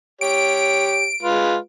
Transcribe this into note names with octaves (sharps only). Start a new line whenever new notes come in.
G4 C#5 D7
G#3 F4 B4